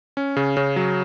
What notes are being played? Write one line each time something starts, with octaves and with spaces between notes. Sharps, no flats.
C#4
C#3
C#3
F#3